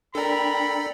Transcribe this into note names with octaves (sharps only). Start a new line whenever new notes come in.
D4 A4 A#4 D5 G5 B5